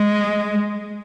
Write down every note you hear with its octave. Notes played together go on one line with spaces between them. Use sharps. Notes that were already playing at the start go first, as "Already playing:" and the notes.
Already playing: G#3